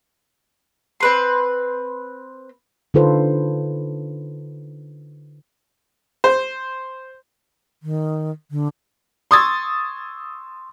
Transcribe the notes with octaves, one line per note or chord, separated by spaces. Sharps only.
C4 B4 C6
D3 D#4 F4 A4 B4 C5
C5
D#3
D3
C6 C#6 D#6 E6 G#6 A6